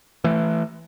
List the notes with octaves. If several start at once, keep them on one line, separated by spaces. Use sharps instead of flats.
E3 A3